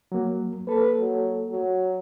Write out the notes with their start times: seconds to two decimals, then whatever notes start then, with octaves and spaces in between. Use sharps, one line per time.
0.12 F#3 A#3
0.67 A#3 A4 B4
0.98 F#3
1.50 F#3